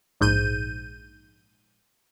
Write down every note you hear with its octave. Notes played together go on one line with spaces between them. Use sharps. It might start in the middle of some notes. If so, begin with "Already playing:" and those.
A#1 G#2 G6 D#7